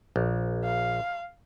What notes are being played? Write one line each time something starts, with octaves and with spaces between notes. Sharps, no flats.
A#1
F5